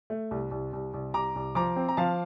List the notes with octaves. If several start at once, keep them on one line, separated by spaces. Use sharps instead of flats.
A3
C2
C2
C2
C2
C2 A#5 D6
C2
F3 A#5 D6
C4
A#5
F3 F5 A5